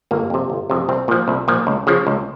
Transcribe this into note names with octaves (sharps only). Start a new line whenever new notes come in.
G1 A#3
F2 C3
G1
F2 C3
C2 C4
A#2 F3
C2
A#2 F3
C#2
C#3 F3
C#2